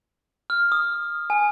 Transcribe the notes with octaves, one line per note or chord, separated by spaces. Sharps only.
F6
D#6
G#5